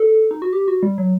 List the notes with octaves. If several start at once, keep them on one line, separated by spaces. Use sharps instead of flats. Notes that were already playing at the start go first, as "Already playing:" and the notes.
Already playing: A4
D#4
F#4
G4
F#4
G3
F#3